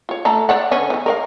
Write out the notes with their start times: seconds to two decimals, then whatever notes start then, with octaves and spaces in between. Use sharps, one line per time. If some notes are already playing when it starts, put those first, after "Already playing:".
0.09 F4 C#5
0.25 A3 A4 A#5
0.49 C5 D5 F#5
0.71 D3 B3 C#4
0.90 D#3 E3
1.06 A#4 D5 F5